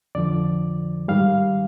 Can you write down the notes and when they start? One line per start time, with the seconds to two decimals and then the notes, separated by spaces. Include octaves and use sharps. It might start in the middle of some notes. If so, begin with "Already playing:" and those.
0.15 F2 D3 F3 D5
1.08 G#2 D#3 G3 F5